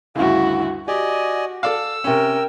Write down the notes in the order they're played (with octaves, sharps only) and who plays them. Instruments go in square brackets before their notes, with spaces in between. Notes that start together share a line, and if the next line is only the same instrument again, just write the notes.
[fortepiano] D2 G2 C#3 [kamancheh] E4 F#4
[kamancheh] F#4 [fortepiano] G4 [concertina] D5 D#5 G#5
[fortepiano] A4 D5 F5 [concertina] E6
[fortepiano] C3 C#4 [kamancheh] A#4 G5